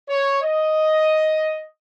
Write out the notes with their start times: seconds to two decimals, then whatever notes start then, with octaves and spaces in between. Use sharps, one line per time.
0.09 C#5
0.42 D#5